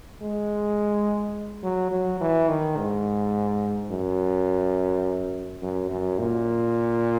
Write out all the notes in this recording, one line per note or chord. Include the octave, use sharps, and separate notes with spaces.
G#3
F#3
F#3
E3
D#3
G#2
F#2
F#2
F#2
A#2